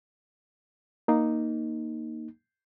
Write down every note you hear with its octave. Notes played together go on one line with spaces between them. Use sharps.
A#3 D#4